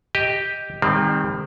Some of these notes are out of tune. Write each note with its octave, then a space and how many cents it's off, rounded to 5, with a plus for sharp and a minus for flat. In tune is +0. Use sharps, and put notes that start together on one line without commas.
G4 +0 D#5 +0
D#3 -10 G3 +40 C4 +0